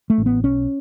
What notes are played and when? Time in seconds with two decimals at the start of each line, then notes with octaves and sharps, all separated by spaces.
0.10 A3
0.18 A1
0.26 B3
0.44 B1 C#4